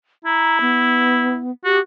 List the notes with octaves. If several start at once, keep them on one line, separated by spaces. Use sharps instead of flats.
E4 A#5
B3
F#4 G4